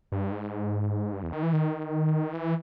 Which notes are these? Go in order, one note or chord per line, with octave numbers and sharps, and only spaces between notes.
G2
G#2
G2
E2
D#3
E3
D#3
E3